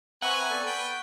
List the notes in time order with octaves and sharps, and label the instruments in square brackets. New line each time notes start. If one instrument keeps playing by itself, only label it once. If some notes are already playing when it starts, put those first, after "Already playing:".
[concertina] C4 E5 A#5 [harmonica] B4 G#5 [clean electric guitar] F#5 [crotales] C#6 F#6
[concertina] B3 A4 D5
[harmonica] B4 G5 [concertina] B5